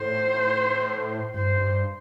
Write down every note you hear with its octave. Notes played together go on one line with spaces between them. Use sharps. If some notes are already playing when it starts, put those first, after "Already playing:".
Already playing: A2 C5
G2 C5
G2